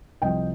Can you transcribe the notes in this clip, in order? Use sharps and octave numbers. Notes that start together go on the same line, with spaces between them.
C2 C3 F3 D#5 G5